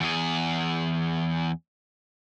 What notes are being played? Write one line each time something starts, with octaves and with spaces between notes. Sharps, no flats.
E2 G#4